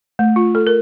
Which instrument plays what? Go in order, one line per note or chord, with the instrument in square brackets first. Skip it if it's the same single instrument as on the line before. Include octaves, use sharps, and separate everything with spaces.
[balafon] A3
F4
A4
A#4